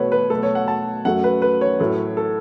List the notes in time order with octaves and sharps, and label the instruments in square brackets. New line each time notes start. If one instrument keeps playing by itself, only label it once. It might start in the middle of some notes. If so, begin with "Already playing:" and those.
Already playing: [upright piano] B2 A3 B4 C#5 F#5
B4
B2 F#3 A3 A4
C#5
F#5
A5
F#2 F#3 A3 F#5
B4
B4
C#5
A2 F#3 A3
A4